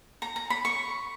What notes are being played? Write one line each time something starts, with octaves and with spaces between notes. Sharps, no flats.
A#5
A#5
B5
C#6